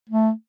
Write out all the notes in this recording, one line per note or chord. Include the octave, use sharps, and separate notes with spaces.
A3